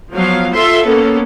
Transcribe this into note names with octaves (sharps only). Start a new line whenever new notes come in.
F3 F#3 B3 F5
F4 A4 E5 C6
A#3 B3 C#4 A4